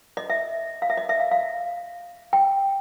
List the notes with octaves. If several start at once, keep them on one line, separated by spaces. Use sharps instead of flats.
D#5
E5
F5
E5
D#5
E5
F5
F5
G5